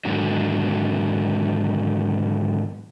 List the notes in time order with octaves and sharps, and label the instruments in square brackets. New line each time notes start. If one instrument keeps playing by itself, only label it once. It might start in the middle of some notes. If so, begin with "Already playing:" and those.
[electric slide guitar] G#2 D3 D#3 F#3